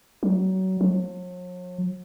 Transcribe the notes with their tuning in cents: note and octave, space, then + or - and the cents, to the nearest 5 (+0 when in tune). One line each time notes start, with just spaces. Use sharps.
F#3 +25
F#3 -45